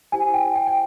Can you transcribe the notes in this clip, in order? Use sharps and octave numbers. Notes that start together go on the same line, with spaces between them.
E4 G4 C5 G#5
G5
G5
G5